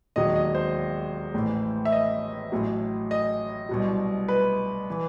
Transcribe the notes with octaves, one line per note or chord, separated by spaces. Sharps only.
E1 D#2 D#3 F#3 D#5
D#5
C5
A1 A2 E3
E5
D#5
A1 A2 F#3
D#5
C2 B2 F#3
B4
E3